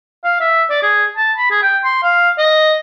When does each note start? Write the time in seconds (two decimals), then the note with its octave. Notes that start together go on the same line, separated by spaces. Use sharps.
0.24 F5
0.40 E5
0.70 D5
0.83 G#4
1.17 A5
1.37 B5
1.51 G#4
1.63 G5
1.84 C6
2.03 F5
2.38 D#5